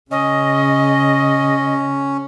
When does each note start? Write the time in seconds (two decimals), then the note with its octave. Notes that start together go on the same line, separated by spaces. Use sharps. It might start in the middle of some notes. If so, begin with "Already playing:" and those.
0.11 C#3 C#4 D#5